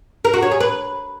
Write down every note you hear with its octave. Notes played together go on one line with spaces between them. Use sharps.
A#4
F#4
C#5
G#4
B4